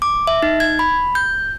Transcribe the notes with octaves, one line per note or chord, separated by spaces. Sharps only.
D6
E5
D#4
G#6
B5
G6